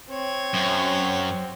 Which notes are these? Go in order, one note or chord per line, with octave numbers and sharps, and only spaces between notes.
C4 C#5
F#2